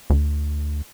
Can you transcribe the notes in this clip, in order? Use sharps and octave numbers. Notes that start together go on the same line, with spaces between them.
D2